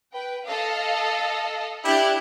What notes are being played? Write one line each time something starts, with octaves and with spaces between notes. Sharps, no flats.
B4 G5
A4 D#5 F5
D4 E4 G4 F#6 G6